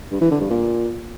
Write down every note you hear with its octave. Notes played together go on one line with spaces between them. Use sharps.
G2
E3
D3
G2
A#2